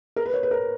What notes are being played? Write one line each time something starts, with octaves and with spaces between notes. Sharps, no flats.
A#4
B4
C#5
B4
A#4